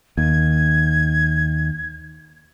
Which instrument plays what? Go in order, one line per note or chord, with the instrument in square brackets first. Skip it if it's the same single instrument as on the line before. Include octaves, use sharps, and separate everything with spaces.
[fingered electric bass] D#2 [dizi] G#6